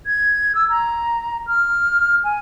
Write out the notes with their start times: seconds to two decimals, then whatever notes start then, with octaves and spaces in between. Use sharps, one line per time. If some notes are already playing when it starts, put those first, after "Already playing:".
0.07 G#6
0.55 E6
0.69 A#5
1.47 F6
2.24 G#5